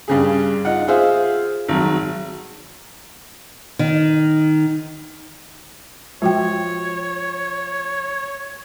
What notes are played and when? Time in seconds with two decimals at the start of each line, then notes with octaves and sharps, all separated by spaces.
0.08 G2 C#3 G#4
0.65 D#4 F4 F#5
0.88 F4 G#4 C5 E5 F5
1.69 G#1 F#3
3.79 D#3
6.22 F3 G#3 F#4 C#5 G5